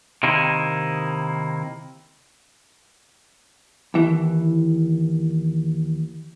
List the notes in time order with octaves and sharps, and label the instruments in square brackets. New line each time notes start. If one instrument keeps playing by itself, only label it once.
[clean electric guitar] C3 D#3 A#3 D#4 E4
[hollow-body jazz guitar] D#2 E3